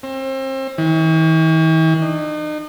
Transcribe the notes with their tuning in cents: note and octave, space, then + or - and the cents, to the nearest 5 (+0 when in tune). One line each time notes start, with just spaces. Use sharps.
C4 +35
E3 -45
D#4 -40